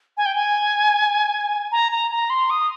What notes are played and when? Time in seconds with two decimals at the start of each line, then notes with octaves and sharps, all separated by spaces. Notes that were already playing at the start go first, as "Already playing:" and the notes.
0.17 G#5
0.26 G5
0.36 G#5
1.72 A#5
1.92 A#5
2.11 A#5
2.30 C6
2.50 D#6